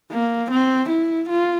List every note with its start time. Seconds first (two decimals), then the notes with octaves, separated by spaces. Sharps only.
0.12 A#3
0.51 C4
0.89 E4
1.29 F4